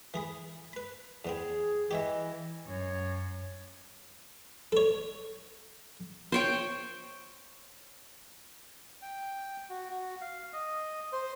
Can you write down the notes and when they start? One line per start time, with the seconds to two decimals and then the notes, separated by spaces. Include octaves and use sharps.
0.14 E3 G#4 B5
0.73 B4 B5
1.25 E2 B3 C4 G#4
1.91 E3 G4 C#5 D#5 E5
2.67 F#2 C#5
4.72 A4 C#5
6.32 C5 C#5 G5
9.02 G5
9.70 F#4
9.90 F#4
10.21 F5
10.53 D#5
11.13 C5